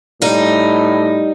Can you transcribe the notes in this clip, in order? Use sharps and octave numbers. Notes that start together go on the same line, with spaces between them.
A2 G3 D#4